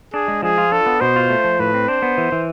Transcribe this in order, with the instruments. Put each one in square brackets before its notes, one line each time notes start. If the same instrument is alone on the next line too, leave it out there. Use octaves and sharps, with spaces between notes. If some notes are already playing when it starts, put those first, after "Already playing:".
[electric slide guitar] D4 [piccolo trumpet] G#4
[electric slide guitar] G#3
[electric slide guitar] F3 [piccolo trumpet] G#4
[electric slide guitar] F4
[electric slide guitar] D4 [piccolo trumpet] A4
[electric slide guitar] B3
[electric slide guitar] B2 [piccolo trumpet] C5
[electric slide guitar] F4
A3
F3
[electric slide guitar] A2 [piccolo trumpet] B4
[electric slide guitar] C4
[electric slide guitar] D4 [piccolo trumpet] C5
[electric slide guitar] B3
E3
E3